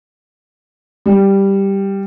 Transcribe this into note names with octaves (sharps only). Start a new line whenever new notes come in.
G3